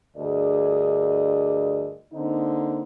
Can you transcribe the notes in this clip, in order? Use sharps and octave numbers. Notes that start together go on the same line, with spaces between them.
D2 G2 G#4 A#4 D5 D#5
D3 A#3 C4 D#4